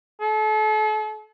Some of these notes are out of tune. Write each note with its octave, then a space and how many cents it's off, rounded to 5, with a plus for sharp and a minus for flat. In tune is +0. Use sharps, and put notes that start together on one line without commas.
A4 -40